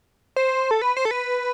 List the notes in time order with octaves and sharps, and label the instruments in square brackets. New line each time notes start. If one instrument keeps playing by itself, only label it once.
[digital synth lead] C5
A4
B4
C5
A4
B4